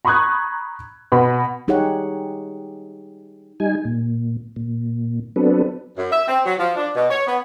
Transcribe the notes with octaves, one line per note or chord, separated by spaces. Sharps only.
A#5 B5 C#6 D#6 F#6 G#6
B2 B5
G3 D#4 G4 G#4 C#5 F#5
G3 D#4 G#5
A#2
A#2
F#3 B3 C4 D4 A4 B4
F#2
E5
C4
F#3
F3
D4
B2
C#5
B3